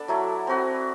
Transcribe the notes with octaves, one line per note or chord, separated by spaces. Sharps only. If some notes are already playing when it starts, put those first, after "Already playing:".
Already playing: B3 D4 A4 B4 D5
F#3 A3 E4
C4 F#4 B4